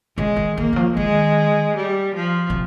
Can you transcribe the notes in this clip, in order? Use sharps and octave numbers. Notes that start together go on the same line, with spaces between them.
C#3 G#3
D#3
D#3 A#3
D#3
F3
D#3 G#3
G3
F3
C3